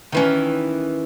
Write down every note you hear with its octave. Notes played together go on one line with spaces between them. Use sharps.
D#3 E3 C#4